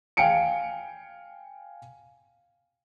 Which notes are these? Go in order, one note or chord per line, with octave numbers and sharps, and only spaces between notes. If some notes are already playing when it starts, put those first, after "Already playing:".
F5 G5 G#5 C#7 D7